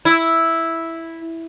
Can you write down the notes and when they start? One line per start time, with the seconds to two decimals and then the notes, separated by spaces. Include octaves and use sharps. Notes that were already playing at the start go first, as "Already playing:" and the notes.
0.05 E4